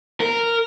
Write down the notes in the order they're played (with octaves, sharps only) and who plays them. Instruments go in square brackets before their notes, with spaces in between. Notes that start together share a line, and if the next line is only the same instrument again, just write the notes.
[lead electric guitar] A#4